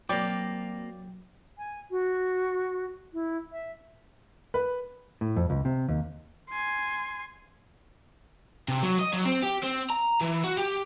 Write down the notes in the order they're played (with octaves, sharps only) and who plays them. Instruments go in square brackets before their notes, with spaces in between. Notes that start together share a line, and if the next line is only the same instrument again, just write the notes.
[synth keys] F#3 [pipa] G3 G4 [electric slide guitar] A#3 C4 [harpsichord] D5
[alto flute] G#5
F#4
E4
E5
[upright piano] B4
[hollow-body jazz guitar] A2
F2
C#2
C3
D#2
[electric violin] G#5 C6
[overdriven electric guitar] C3
F#3
D#5
F#3
C4
G4
C4
A#5
E3
F#4
G4